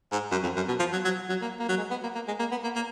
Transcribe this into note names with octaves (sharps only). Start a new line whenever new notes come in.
G#2
F#2
F2
F#2
B2
F3
F#3
F#3
F#3
A#3
A#3
F#3
G#3
B3
A#3
A#3
G#3
A#3
B3
A#3
A#3